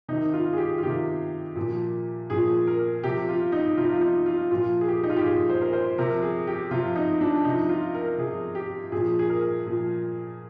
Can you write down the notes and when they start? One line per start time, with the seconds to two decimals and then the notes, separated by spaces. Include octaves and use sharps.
0.08 C3 D#3 D#4
0.33 F4
0.53 G#4
0.58 G4
0.78 F4
0.82 C3 D#3 G4
1.56 A#2 F3
2.30 A#2 F3 G#4
2.67 A#4
3.04 C3 F3 G4
3.29 F4
3.52 D#4
3.77 C3 F3 F4
3.85 D#4
3.93 F4
4.01 D#4
4.26 F4
4.51 A#2 F3 F4
4.81 G#4
4.88 G4
5.03 D#4
5.10 F4
5.17 G4
5.24 A#2 F3 G#4
5.49 C5
5.62 A#4
5.73 C5
5.98 C3 F3 A#4
6.22 G#4
6.47 G4
6.71 C3 F3 F4
6.95 D#4
7.21 D4
7.45 C3 F3 D#4
7.69 F4
7.95 A#4
8.18 C3 F3 G#4
8.55 G4
8.92 A#2 F3 G#4
9.19 G#4
9.29 A#4
9.67 A#2 F3